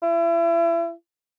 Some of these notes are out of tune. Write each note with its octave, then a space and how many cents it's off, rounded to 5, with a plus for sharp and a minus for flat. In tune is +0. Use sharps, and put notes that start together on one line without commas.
E4 +35